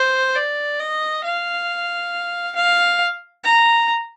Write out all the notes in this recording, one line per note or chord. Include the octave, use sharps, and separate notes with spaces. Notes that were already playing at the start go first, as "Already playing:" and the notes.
Already playing: C5
D5
D#5
F5
F5
A#5